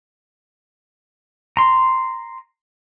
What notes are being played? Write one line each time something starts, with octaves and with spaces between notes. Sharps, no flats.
A#5 C6